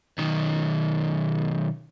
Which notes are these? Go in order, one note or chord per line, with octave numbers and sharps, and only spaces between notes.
B1 D#3